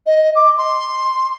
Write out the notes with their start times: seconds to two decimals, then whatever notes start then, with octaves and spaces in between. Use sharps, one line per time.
0.06 D#5
0.35 D6
0.58 C6